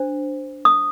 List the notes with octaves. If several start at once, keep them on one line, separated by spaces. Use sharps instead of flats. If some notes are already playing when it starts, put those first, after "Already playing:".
Already playing: D4 C5
D#6